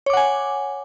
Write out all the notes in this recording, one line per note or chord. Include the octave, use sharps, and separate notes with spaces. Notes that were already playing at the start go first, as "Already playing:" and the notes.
C#5 F#5 G#5 D6